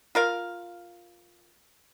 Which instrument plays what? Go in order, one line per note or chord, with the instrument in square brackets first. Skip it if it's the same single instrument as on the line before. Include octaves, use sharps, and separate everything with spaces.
[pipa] F4 A#4 F5